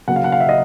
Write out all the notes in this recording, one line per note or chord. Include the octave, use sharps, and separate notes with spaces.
C#3 F#3 A#3 F#5
F5
F#5
F5
E5
D#5